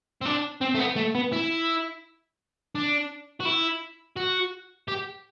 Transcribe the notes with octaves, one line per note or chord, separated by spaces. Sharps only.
C4
D4
C4
A3
B3
A3
B3
E4
D4
F#4
E4
F#4
G4